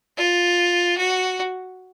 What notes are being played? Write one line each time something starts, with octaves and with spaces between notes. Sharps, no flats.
F4
F#4